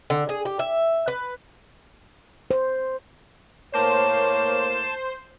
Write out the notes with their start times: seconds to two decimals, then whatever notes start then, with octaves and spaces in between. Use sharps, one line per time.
0.10 D3
0.29 G#4
0.45 G4
0.59 E5
1.08 B4
2.51 C5
3.74 A2 A#3 C5 C#5 A5